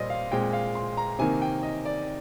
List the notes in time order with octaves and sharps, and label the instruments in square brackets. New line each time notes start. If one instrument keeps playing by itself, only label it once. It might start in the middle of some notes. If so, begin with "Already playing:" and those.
Already playing: [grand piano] A#2 G3 C4 D5 D#5
F5
A#2 G#3 C4 G5
F5
C6
A#5
C3 D#3 A#3 G#5
G5
D#5
D5